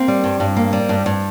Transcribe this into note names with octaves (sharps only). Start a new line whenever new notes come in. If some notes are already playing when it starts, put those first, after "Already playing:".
Already playing: A#3 C4
G3
G2
G2
A#3
G3
G2
G2